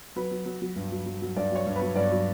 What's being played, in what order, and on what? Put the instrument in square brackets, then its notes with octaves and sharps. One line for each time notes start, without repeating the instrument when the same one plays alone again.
[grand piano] F#3 B4
F#3
F#3
F#3
G2
F#3
F#3
F#3
G2 D5
F#3 C#5
G2
B4
F#3
G2 D5
F#3